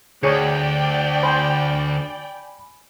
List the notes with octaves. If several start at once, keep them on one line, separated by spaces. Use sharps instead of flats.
D2 G#4 C#5 D5 G5 C#7
C5 G#5 B5